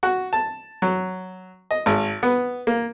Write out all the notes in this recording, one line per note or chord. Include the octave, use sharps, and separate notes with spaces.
F#4
A5
F#3
D#5
G#1
B3
A#3